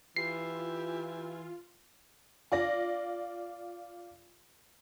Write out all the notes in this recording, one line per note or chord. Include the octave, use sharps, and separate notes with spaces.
E3 F4 G4 C7
F4 D5 A#6